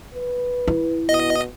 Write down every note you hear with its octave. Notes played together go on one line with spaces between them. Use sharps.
B4
E4
B2 D#5